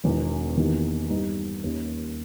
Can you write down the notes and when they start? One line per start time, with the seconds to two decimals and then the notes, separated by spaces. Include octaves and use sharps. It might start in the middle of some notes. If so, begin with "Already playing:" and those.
0.04 E1 E2 D#3
0.57 E2 D#3 A#3 D#4 G4
1.10 G2 G3 B3 D#4
1.64 D#2 D#3 G3 A#3 C#4